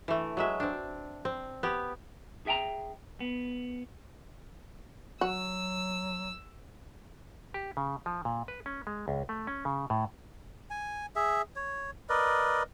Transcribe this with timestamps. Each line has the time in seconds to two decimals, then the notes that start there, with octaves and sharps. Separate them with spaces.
0.08 E3 A3
0.37 F#3 G#3 E5
0.60 C4 D4
1.25 C4
1.63 B3 G4
2.46 G#4 E5 G5 G#5 A#5
3.20 B3
5.21 F#3 F#4 E6
7.54 G4
7.77 C#3
8.06 F3
8.25 A#2
8.48 B4
8.66 C#4
8.87 G#3
9.08 C#2
9.29 A3
9.47 C#4
9.65 C#3
9.90 A2
10.70 G#5
11.16 G#4 E5
11.56 C#5
12.09 A#4 B4 D5 D#5